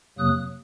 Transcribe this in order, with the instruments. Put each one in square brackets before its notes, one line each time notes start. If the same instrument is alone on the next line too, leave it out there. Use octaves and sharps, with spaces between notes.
[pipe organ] F2 C3 F#3 A#3 D#6 F#6